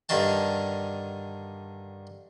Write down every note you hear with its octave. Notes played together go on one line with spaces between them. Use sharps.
G2 D3 D#3 A5